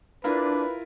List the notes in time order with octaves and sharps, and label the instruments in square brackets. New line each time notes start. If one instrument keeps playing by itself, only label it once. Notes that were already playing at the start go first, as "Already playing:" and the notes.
[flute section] D4 [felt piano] E4 F4 A#4 [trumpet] B4